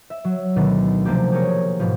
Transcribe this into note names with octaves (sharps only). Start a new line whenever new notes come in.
E5
F#3
D2 B2 D#3 B3
C3 F3 A3 A#3 G4
G4 G#4 A#4 C#5
G#2 B2 F3